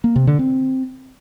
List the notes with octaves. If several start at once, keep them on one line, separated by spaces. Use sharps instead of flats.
A#3
C3
D3
C4